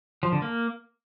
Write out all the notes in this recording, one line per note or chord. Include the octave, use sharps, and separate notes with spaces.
F3
D3
A#3